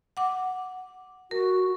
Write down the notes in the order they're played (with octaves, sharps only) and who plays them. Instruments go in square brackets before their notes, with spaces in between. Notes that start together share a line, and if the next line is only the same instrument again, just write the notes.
[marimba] F#5 D6
[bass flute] F#4 [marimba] A#4